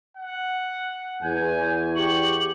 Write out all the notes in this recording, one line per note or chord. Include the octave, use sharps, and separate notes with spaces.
F#5
E2 G#5 G6
G4 C#6 F#7